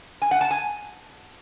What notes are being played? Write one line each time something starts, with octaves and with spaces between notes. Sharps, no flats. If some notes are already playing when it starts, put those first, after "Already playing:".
G#5
F#5
A5
G#5